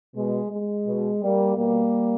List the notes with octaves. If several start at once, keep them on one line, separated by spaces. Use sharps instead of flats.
B2 G#3
G#3
B2
G3 A#3
B2 G3 A#3